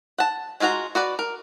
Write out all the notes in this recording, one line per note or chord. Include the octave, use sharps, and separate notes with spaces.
F#5 A5
G#3 F4 F#4 G#4 A#5
F#4 B4 D5
A#4